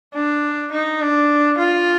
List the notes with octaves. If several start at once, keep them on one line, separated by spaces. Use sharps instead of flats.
D4
D#4
D4
F4